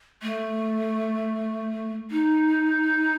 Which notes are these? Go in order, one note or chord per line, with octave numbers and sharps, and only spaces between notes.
A3
D#4